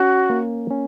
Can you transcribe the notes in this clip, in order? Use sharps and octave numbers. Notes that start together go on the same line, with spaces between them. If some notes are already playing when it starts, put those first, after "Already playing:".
Already playing: C#4 F#4
A#3
C#4